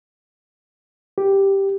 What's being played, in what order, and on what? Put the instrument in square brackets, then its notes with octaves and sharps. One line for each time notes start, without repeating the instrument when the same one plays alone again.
[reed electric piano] G4